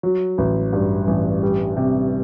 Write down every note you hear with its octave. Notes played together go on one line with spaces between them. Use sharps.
F#3
A1
G2
A1
G3
C3